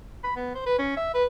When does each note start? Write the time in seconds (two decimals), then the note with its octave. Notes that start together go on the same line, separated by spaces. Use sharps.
0.24 B5
0.36 B3
0.55 C5
0.66 B4
0.79 C#4
0.97 E5
1.15 B4